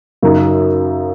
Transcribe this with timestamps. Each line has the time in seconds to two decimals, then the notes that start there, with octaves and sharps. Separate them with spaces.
0.23 F#2 C#3 F#3 D#4